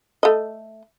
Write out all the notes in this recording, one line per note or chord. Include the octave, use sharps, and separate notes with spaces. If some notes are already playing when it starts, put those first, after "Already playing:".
A3 D#5